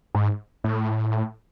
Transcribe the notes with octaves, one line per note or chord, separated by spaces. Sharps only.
G#2
A2